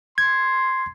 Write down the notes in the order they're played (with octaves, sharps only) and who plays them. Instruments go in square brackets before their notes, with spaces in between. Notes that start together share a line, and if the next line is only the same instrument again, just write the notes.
[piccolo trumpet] C6 [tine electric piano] G#6